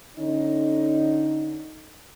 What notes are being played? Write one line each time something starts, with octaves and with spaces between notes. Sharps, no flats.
D3 C#4 D#4